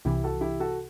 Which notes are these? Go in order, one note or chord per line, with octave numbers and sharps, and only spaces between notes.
C2 C3 E3 E4 G4
F#4 A4
E4 G4
F#4 A4